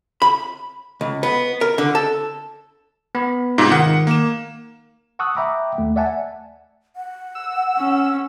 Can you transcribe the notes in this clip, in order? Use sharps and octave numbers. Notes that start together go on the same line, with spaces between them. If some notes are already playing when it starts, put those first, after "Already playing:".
B5
C#2
B3
A#4
D3
A4
B3 B5
G#2 C3 D#4 F4 G#4
D#3 F#5
A#3 E7
F#5 A5 C#6 D#6 E6 F#6
E5 F#5 G5 A#5 B5 D6
D#2 A3
D5 E5 F#5 G#5 A5
F#5
E6
C#4